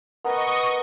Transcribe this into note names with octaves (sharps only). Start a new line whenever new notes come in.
B3 A#4 B4 D#5 C#6